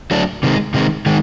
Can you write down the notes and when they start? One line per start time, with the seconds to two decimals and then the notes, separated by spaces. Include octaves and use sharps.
0.11 F#3 A3 D4
0.43 C3 D#3 G#3
0.74 C3 D#3 G#3
1.06 D#3 G#3